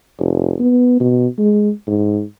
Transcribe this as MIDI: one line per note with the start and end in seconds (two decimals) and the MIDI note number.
0.19 0.54 29
0.59 0.98 59
1.00 1.27 47
1.38 1.70 56
1.87 2.23 44